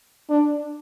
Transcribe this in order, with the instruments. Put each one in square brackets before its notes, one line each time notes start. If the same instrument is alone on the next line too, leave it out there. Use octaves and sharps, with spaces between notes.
[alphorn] D4